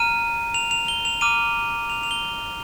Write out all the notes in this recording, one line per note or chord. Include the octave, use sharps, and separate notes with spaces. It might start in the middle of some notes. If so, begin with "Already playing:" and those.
Already playing: A#5 F6 D#7
F7
F7
G7
F7
A#5 D6 F6 D#7
F7
F7
G7
F7